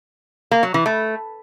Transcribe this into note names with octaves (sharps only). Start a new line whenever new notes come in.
A#3
F#3
E3
A3